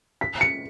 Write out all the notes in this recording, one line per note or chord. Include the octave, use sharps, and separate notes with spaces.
B6
C#7